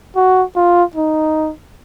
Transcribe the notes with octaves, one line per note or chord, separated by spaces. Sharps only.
F#4
F4
D#4